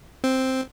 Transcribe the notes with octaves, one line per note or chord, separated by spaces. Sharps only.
C4